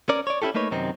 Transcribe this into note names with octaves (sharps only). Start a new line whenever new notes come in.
C#4 A#4 D5
C#5 D5
C#4 E4 F4 G4 A4
A3 A#3 D#4 B4 C#5
F#2 C3 D#3 C4 D#4